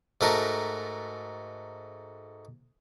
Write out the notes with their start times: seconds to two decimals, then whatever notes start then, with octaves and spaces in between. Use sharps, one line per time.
0.21 G#2 A3 F#4 A#4 A5